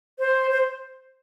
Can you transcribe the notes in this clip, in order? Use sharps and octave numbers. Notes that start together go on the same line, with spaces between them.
C5
C5